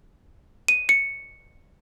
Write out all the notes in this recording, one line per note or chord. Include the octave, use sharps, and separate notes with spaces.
D#7
C#7